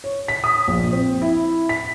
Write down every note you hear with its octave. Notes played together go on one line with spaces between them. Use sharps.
C#5
B6
D#6
A#1
C4
E4
B6